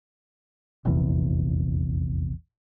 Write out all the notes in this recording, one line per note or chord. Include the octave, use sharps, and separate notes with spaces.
F1 A#1 E2 C3